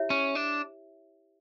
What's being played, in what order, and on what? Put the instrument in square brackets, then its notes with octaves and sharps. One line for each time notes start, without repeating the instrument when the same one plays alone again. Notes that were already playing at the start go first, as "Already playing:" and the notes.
Already playing: [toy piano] E4 G4 C#5 E5
[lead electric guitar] C#4
D4